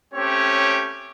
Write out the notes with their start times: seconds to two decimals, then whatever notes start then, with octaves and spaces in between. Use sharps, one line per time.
0.14 A3 C4 C#4 G4 C#5